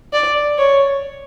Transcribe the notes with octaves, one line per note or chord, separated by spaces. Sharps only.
D5
C#5